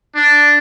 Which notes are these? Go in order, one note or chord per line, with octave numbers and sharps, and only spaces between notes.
D4